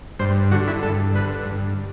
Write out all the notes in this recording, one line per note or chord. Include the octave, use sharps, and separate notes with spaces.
G2 C5
D3 F#4
E4
G2 A4
D3 B4
G2